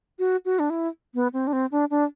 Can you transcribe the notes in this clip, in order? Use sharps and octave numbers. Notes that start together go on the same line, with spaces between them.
F#4
F#4
D4
E4
B3
C4
D4
C4
D4
D4